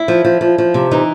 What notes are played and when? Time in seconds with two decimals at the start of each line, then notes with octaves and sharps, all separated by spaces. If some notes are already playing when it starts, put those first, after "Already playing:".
Already playing: E4
0.08 F3
0.25 F3
0.41 F3
0.58 F3
0.74 C3
0.91 E3 D#4